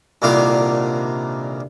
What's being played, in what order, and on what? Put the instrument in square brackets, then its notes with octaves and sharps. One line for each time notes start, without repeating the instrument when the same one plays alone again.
[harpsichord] C2 A#2 D3 D#3 F5 D6